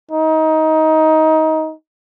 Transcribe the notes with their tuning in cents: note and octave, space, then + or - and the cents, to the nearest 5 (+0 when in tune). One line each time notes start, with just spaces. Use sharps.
D#4 +20